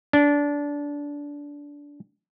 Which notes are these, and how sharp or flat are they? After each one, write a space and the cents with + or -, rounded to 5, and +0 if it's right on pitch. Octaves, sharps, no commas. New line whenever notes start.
D4 -20